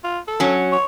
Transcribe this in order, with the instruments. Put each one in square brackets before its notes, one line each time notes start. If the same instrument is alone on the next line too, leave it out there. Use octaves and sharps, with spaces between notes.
[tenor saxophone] F4
A4
[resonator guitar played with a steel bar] F#3 C#4
[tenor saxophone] C#5